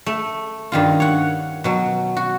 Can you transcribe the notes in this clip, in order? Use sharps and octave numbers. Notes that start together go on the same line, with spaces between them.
A3
G2 D#3 F4
C#5 F#5
B2 F#3
F#4